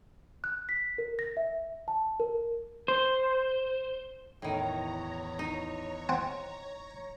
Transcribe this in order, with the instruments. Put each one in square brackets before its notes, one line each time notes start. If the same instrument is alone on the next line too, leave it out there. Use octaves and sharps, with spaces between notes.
[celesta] F#6
B6
A#4
A#6
E5
A5
A#4
[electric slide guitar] C5
[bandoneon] E2 [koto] A2 D#3 [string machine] C#5 A#5
[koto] D#4
[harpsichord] C4 C5 F#5